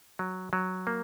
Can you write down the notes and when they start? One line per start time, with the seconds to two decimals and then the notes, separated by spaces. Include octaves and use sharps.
0.19 F#3
0.53 F#3
0.87 A#3